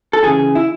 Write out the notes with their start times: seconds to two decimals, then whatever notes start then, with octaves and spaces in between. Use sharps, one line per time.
0.13 A4
0.24 C#3 E3 G#4
0.55 E4